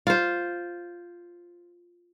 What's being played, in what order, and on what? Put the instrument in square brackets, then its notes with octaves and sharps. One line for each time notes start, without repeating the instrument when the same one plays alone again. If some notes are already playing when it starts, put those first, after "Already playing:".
[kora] F4 C5